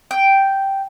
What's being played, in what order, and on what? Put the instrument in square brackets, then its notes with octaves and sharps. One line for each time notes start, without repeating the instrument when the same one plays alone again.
[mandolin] G5